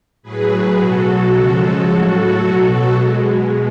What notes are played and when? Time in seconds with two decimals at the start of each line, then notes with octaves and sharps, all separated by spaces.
0.23 A2 F#3 G#4 B4
0.76 B2 F#3 F#4 A4
1.30 C#3 F3 G#3
1.84 A2 F#3 F#4 A4
2.38 B2 F#3 F#4 A4
2.93 B2 G#3